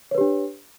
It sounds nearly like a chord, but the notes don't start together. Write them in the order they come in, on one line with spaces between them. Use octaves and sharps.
C#5 B4 G4 D4